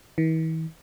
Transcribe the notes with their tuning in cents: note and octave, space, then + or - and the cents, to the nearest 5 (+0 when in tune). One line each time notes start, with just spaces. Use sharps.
E3 -45